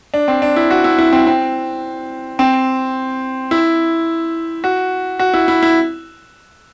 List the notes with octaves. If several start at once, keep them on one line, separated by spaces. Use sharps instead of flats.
D4
C4
D4
E4
F#4
E4
E4
C4
C4
C4
E4
F#4
F#4
E4
E4
E4